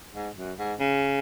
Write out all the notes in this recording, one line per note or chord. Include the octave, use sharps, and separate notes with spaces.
G#2
F#2
G#2
C#3